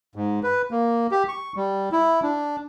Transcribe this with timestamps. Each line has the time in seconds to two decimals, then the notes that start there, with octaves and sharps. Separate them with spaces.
0.15 G#2
0.43 B4
0.71 A#3
1.11 G4
1.28 C#6
1.56 G3
1.92 E4
2.23 D4